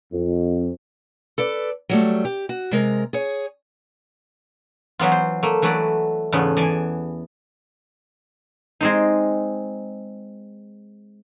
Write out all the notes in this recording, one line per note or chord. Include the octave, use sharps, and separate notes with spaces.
F2
A4 B4 D5
F#3 G3 A3
G4
F#4
C3 G#3 A#4
G#4 C#5
E3 F#3 B3 F4
C5
A3 A#3
E3 F#3 A3 B4 D5
E2 G#2 C#3 A3 B3
E3 D5 G#5 A5
G#3 C4 D#4